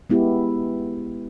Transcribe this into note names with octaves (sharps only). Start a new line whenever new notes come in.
G#3 B3 E4 G4